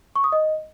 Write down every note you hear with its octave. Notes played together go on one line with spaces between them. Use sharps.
C#6
D#6
D#5